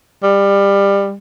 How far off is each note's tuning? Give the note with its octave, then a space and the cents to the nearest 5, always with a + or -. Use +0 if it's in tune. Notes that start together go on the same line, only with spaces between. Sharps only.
G3 +25